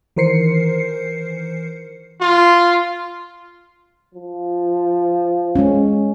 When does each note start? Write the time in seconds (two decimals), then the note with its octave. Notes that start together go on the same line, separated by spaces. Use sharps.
0.16 D#3 E3 A#4 C5 C7 C#7
2.21 F4
4.14 F3
5.55 G#3 C#4